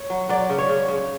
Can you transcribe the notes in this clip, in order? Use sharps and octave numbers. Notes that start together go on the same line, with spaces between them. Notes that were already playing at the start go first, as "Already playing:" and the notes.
Already playing: C#5
F#3
F#3 D5
C#3
C#5
C#3
C#3